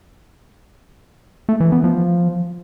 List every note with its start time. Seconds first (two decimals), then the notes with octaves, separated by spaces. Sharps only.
1.49 A3
1.60 E3
1.72 B3
1.84 F3